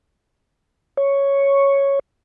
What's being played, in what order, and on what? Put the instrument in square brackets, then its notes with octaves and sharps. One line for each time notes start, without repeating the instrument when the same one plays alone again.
[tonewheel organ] C#5